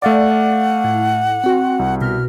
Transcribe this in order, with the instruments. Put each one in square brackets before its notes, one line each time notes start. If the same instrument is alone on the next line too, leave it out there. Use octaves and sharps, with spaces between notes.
[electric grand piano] A3 F5 D6 [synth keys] D5 [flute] F#5
[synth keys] A2
C4 F#4
[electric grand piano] C2
[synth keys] B2 [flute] F6